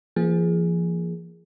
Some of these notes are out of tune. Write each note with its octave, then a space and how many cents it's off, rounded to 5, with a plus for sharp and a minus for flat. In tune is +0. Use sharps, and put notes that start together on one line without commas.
F3 -40 A#3 +5 G#4 +0